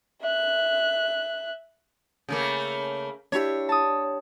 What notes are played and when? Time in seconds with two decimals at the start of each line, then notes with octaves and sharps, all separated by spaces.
0.22 E5 F#6
2.29 C#3 A3 A#3
3.32 D4 E4 G4 C#5
3.69 A5 D#6